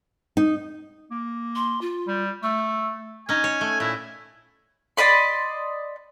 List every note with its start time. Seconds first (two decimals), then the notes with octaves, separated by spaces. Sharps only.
0.37 D#4
1.11 A#3
1.55 C6
1.81 F4
2.07 G3
2.43 A3 E6
3.29 C#4 D#4 G#5
3.44 C#5
3.61 A3
3.80 A#2 E4
4.97 D5 D#5 B5 C6